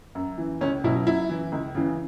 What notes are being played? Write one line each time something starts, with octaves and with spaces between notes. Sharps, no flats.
F#2
E3
C#2 C#4
B2 F#3 E4
F#2 E4
E3
C#2
C#3 E3